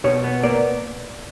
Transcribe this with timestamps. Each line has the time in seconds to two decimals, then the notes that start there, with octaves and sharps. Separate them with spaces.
0.04 B2 C#5
0.24 B3
0.43 A#3 D5